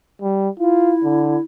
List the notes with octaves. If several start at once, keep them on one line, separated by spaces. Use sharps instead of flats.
G3
E4 F4
D3